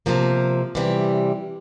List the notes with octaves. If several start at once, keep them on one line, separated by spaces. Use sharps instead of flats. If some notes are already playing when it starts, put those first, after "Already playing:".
C3 F3 A#3
C3 E3 G3